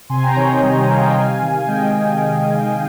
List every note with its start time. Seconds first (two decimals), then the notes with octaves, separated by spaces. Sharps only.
0.09 C3 G#5 C6
0.23 G5 A#5
0.36 D#3 C#5
0.49 D#5
0.62 G3
0.76 D#5
0.88 C3 C#5 F5
1.01 D#5 G5
1.15 C3 F5 G#5
1.42 D#3
1.60 G#5
1.68 G#3 D#5 G5
1.94 C3